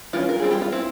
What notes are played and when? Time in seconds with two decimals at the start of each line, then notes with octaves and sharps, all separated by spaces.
0.13 E3 A#3 C#4 F4
0.29 A#4
0.40 G3 C4 G#4
0.51 G4
0.62 F4
0.72 C4 E4